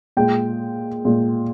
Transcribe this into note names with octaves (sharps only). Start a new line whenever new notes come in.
A#2 G#3 G5
A#2 G#3